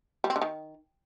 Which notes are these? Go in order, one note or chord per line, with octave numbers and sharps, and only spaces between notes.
G3
C4
D3
D#3